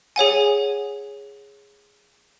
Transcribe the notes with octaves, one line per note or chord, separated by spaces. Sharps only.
G#4 C#5 F#5 G#5